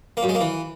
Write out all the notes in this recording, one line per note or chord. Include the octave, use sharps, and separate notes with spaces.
A#3
F#2
G#3
A#3
E3